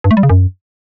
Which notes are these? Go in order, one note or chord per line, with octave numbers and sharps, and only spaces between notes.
G2
A3
G3
C#3
F#2